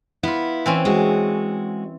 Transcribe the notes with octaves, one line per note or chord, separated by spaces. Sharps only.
B3 E4 F4
E3 C4 C#4
G#3 F#4